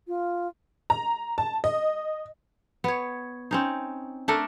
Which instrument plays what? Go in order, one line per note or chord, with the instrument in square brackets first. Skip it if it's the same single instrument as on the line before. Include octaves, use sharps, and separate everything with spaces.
[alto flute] F4
[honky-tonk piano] A#5
A5
D#5
[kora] B3 C#5
C4 C#4 D#4
A3 D4 A4 A#4